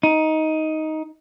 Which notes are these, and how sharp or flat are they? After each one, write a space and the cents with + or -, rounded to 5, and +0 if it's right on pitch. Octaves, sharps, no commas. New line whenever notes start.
D#4 +10